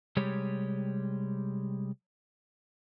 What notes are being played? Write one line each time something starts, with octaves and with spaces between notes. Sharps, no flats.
C3 G3 G#3 G4 C#5